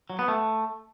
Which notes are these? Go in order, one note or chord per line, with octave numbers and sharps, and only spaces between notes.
F#3
B3
A3